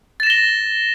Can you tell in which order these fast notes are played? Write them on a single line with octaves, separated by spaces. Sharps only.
A6 E7 A#6 G7